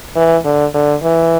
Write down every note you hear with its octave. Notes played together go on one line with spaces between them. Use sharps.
E3
D3
D3
E3